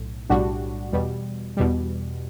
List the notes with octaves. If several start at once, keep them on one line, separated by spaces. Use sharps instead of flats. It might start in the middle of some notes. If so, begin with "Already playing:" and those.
Already playing: B1 A2
B1 A2 G3 D4 F#4
E2 B2 G3
E2 B2 G3